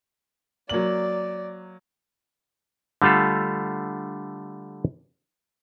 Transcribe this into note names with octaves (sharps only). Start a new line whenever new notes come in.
F#3 A#3 D5 F#7
D3 G3 A3 F4 A4